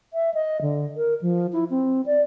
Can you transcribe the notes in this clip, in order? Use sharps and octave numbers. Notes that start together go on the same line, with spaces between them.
E5
D#5
D3
A#4
F3
E4
C4
D5